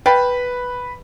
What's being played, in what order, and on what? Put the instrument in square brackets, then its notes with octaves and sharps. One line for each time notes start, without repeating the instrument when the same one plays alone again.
[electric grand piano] B4 B5 [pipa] F5 G5 A5